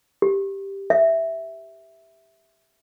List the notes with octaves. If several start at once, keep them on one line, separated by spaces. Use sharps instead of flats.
G4
E5